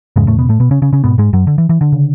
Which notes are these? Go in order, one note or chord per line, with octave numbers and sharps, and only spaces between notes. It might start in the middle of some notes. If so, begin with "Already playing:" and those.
E2 G#2 C#3 G#3
A2 A3
B2 B3
A2 A3
B2 B3
C#3 C#4
C#3 C#4
C#3 C#4
G#2 B2 B3
G#2 G#3
F#2 F#3
D3
E3
E3
D3
C#3